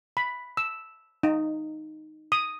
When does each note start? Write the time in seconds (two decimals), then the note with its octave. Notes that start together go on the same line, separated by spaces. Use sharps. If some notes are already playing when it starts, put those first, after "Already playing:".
0.17 B5
0.57 E6
1.23 D#4
2.32 D#6